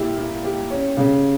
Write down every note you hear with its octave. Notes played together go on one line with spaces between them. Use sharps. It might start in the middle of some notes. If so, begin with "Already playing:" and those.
Already playing: A#2 E4 G4
E4
G4
C#4
C#3